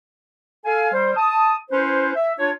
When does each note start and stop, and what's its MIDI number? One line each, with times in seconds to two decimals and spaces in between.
0.66 0.91 69
0.66 0.91 77
0.66 0.91 80
0.93 1.15 55
0.93 1.15 72
1.16 1.56 81
1.16 1.56 87
1.71 2.12 61
1.71 2.12 64
1.71 2.12 71
1.71 2.12 72
2.15 2.33 76
2.39 2.52 62
2.39 2.52 65
2.39 2.52 73